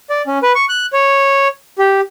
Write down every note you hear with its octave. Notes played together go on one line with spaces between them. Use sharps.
D5
C#4
B4
C#6
F#6
C#5
G4